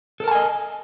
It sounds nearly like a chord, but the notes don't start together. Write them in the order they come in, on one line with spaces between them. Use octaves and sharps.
A4 A#4 A5 G#5 D#5